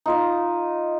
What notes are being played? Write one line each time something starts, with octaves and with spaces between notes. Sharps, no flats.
D#4 F4 D#5